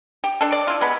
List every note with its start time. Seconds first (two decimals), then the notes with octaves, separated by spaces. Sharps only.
0.24 G4
0.41 D4 A4
0.52 D5
0.67 E4 F4
0.81 G#3 B3 B5